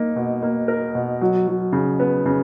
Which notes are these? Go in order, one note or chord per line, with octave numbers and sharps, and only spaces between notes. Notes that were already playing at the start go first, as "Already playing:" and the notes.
Already playing: A#3 D#4
B2
A#3
A#4
B2
F#3
F#3
C#3
B3
C#3